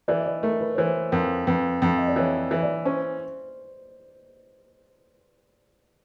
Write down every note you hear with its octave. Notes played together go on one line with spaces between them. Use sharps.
E3 D5
D#5
D5
A3 A#4
B4
C#5
E3 C5
F2 A#4
F2 B4
F2
D#5
D5
E3 C#5
E3
D5
C#4 C5